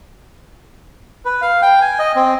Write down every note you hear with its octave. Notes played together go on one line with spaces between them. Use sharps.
B4
F5
G5
G#5
D#5
C4